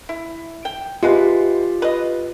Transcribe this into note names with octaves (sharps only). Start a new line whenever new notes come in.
E4
G5
C3 G#3 F4 G4 B4
B4 D#5